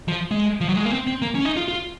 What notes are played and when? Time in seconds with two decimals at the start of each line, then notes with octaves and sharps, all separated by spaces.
0.08 F3
0.31 G#3
0.61 F3
0.69 F#3
0.77 G#3
0.85 A#3
0.92 C4
1.07 C4
1.22 A#3
1.35 C#4
1.45 D#4
1.56 F4
1.68 F4